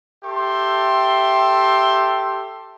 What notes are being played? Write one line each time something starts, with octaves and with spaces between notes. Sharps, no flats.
G4 A4 E5 C6